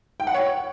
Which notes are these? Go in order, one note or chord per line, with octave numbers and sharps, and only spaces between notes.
G5
F#5
C#5